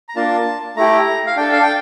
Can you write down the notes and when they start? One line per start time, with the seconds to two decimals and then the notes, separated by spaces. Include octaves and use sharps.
0.09 A#5
0.16 A#3 D4 F4 A5
0.76 A3 E4 G4 A#5
1.27 F5
1.37 D4 A4 G5
1.52 F5
1.62 G5